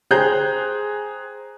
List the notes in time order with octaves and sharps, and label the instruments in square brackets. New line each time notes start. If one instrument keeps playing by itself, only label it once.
[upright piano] G#4 C5 G5 A#5 F#6 G6